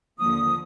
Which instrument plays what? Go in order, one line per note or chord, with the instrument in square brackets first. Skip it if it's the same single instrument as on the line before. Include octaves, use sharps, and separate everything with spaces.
[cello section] D#2 D3 F3 A#3 [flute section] D#6